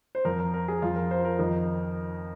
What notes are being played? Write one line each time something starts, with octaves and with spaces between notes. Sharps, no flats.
C5
F2 F3 A#4
A#4
A#4
G#4
F2 F3 F4
A#4
C5
A#4
F2 D#3